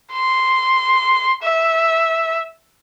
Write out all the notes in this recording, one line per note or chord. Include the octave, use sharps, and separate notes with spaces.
C6
E5